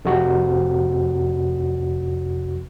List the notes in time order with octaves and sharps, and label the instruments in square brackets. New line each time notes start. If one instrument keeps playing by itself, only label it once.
[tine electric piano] F2 C3 F#4